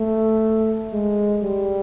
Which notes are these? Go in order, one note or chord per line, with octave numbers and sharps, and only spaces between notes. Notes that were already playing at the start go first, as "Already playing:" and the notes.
Already playing: A3
G#3
G3